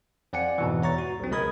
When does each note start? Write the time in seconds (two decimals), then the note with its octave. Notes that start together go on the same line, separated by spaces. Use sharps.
0.33 F2 D5 F#5 G#5 C#7
0.58 G#2 B2 E3
0.82 E2 C#5 A#5 C#6 A6
0.98 F#4
1.20 B1 C4
1.31 C#2 G#3 A#4 B5 D#6 G#6